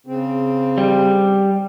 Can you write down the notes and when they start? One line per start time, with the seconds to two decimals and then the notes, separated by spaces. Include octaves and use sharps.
0.07 C#3 C4
0.78 G3